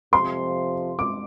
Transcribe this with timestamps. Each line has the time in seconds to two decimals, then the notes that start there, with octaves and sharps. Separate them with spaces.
0.13 F2 C3 F3 C6
0.99 D6